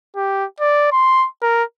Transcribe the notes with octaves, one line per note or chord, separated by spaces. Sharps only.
G4
D5
C6
A#4